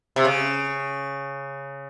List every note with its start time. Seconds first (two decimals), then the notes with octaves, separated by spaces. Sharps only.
0.16 C3
0.25 C#3